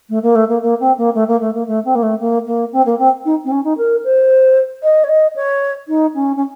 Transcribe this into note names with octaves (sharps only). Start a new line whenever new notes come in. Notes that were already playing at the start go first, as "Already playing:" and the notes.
A3
A#3
A3
A#3
A#3
C4
A#3
A3
A#3
A3
A#3
A3
C4
A#3
A3
A#3
A#3
C4
A#3
C4
D#4
C4
C#4
D#4
A#4
C5
D#5
C#5
D#5
C#5
D#4
C#4
C#4